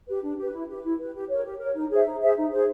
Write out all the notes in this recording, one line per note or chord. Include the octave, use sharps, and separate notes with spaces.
G4 B4
D4
G4 B4
E4
G4 B4
E4
B4
G4
G4
A#4 C#5
G4
A#4 C#5
D#4
G#4 C5 E5
D#4
G#4 C5 E5
D#4
G#4 C5